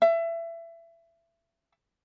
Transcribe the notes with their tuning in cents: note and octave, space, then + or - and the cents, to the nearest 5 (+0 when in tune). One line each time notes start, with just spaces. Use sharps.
E5 +25